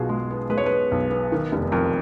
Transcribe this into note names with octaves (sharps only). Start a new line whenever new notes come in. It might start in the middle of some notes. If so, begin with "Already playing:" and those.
Already playing: B1 B2 F4 F#4 G#4
G#3
B3
G#3 B4
C#5
B3 B4
B1
B3
D#3
F1
F2 A#4